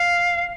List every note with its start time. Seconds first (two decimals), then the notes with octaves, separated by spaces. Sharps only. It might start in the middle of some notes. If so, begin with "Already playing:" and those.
Already playing: F5